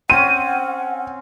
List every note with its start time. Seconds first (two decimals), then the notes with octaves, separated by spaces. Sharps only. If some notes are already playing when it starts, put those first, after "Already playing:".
0.10 C4 C#4 F#5 D#7